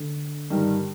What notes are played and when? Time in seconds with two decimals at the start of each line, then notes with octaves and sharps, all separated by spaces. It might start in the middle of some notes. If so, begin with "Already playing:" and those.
Already playing: D3
0.50 G2 D#3 G3